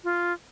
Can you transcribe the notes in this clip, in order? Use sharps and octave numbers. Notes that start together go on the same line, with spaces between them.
F4